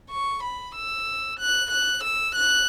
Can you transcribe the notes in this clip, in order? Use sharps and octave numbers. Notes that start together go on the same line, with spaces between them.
C#6
B5
E6
F#6
F#6
E6
F#6